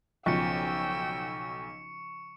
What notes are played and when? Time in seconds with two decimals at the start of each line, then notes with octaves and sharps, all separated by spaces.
0.26 B1 C#3 F3 G5 C#6 E6 C#7